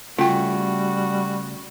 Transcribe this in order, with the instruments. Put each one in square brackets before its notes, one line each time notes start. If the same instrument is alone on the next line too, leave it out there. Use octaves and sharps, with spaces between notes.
[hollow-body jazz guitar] C#3 A3 [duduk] G3 [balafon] F4 G5 [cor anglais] F#4